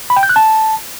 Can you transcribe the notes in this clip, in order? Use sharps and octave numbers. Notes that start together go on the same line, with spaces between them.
B5
G5
G6
F#6
A5